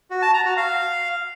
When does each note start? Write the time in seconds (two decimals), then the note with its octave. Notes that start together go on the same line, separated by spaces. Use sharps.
0.11 F#4
0.22 A5
0.34 A#5
0.45 F#4
0.57 F5